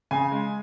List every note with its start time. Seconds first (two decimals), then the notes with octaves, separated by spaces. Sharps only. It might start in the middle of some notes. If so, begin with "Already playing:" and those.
0.11 C#3 G#5
0.32 G#3